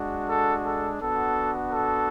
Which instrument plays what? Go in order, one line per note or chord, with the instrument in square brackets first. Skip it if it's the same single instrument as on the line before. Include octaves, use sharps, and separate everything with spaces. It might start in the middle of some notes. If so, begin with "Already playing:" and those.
Already playing: [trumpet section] G#3 D4 F#4
A4
A4
B3 D4 F#4 A4
A4